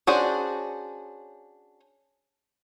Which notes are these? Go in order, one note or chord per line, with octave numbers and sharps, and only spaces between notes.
C#4 D4 F#4 G#4 C5